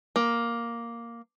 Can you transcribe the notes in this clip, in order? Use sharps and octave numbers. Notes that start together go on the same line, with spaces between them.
A#3